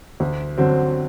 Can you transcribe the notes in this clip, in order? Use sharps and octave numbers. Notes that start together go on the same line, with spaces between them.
D2
D3 F#3 C4